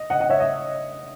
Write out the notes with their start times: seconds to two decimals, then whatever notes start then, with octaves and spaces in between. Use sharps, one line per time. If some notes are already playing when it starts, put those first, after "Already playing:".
Already playing: D#5
0.10 D#5 F#5
0.20 D#5 F#5
0.29 C#5 E5
0.40 D#5